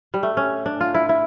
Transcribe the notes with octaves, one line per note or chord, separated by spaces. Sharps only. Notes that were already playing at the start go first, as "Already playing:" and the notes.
G3
A3
C#4
D4
F4
E4
E4